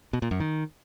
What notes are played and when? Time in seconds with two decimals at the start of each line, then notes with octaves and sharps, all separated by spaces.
0.13 B2
0.22 A#2
0.31 F#2
0.40 D#3